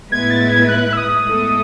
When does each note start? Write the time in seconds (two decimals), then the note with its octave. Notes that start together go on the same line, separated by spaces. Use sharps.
0.11 A2 G#3 B3 E4 B4 G#6
0.30 A6
0.50 G#6
0.69 F#6
0.93 E6
0.97 D#6
1.25 A2 G#3 B3 E4 A4